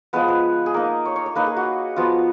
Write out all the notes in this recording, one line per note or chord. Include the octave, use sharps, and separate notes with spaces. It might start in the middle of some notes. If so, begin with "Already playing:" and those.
F3 G#3 B3 B4
B4
G#4
A#3 D#4 A#4
C#5
C#5
C#5
A#3 D#4 B4
G#4
F#4
F3 B3 F4 F#4